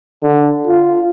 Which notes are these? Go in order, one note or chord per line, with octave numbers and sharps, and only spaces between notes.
D3
F4